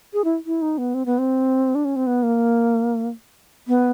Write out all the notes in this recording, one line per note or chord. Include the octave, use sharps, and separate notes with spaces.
G#4
E4
E4
D#4
B3
C4
B3
C4
D4
C#4
C4
B3
A#3
B3